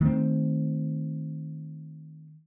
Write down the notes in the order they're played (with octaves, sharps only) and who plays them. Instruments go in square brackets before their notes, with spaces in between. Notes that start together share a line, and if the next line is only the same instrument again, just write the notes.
[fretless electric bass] D#3 A3 B3 C4